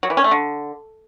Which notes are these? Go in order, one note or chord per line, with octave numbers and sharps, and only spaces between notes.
F#3
E3
C#4
A3
D3